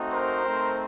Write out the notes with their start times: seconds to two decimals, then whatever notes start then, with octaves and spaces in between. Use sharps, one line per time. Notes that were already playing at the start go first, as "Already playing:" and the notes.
Already playing: A3 C4 D#4 F#4
0.12 A#4 C5
0.45 A3 C4 D#4